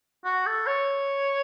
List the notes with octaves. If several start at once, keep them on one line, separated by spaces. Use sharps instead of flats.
F#4
A4
C#5